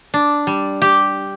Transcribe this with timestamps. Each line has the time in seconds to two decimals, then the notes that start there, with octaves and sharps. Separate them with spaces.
0.14 D4
0.47 G3
0.82 G4